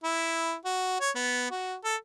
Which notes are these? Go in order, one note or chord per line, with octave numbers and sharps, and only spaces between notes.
E4
F#4
C#5
B3
F#4
A4